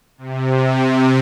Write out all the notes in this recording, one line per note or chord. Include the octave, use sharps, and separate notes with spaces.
C3